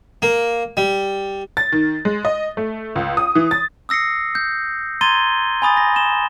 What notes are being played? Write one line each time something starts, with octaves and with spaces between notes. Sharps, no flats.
A#3
G3
A6
D#3
G#3
D#5
A3
C#2
D#6
E3
A6
D#6 E6 A#6 C7 C#7
G6
A#5 C6 G#6 A6 D#7 G7
G#5 B5 D#6 A6
A#6
E7 G7